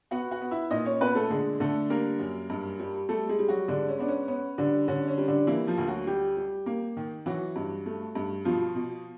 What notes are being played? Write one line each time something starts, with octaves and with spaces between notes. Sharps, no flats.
B3 F#4 F#5
F#4 F#5
B3
E4 E5
A#2 D#4 D#5
C#4 C#5
A#2 B3 B4
A3 A4
D3 G#3 G#4
D3 A3 A4
G3 A#3 A#4
F#2
G2
G3
G3 A3 A4
G#3 G#4
G3
F#3 F#4
G#2 D3 D4
C#4
B3 D4
C#4
B3 C#4
D3 G3 D4
D3 C#4
C#4
G3
D3 D4
E3 A#3 E4
F3 F4
D2
F#3 F#4
G3 G4
G3
A#3
D#3
E3 F#3 F#4
G2
A3
G2
B2 F3 F4
B2